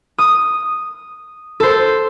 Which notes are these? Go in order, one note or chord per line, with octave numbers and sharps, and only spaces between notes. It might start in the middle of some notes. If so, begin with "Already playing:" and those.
D#6
A4 C5